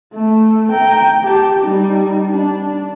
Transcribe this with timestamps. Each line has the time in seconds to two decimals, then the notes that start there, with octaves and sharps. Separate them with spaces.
0.14 A3
0.72 G5 A#5
1.24 G4 A5
1.62 G3 D#4
2.29 D4